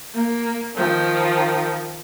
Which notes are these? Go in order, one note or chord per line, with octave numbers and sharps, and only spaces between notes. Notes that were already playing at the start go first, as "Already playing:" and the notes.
A#3
D#3 F3